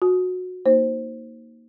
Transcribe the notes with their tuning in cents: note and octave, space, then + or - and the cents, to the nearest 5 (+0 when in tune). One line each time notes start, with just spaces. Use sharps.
F#4 -20 G#5 +40
A#3 +0 D#4 +5 C5 +15